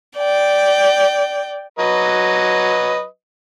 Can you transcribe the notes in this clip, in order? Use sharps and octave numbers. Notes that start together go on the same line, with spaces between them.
D5 G5
F#3 B4 D#5